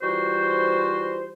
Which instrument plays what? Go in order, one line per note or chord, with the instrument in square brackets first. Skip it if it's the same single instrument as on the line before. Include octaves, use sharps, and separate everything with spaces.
[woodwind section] E3 G3 F4 F#4 C5